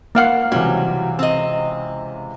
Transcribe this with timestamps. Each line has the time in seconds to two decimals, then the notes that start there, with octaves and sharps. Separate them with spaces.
0.15 A#3 F5 F#5
0.52 C#2 C3 E3 F#3 G3
1.19 C4 D#5